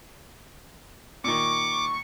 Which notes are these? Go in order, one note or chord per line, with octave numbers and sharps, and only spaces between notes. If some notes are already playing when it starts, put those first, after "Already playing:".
A#2 D#3 C#6 D6